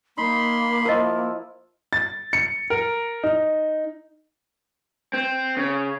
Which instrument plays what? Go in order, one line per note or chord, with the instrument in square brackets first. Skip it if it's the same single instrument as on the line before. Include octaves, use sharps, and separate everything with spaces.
[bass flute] A#3 [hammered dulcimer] D#4 [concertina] B5 C6
[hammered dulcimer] F3 E4 [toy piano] A#4 D#5
[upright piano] A6
C#7
A#4
D#4
[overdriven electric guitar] C4
C#3